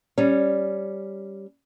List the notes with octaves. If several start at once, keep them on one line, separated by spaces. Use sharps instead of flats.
G3 C#4